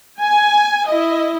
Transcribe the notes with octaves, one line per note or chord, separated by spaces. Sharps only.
G#5
E4 D#5